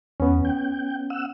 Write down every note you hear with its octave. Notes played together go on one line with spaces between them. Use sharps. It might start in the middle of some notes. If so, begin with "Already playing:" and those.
E2 B3 C#4
G5
F#5 E6